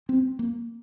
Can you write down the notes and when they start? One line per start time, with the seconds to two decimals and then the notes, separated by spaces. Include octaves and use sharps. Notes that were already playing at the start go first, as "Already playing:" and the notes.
0.09 C4
0.39 A#3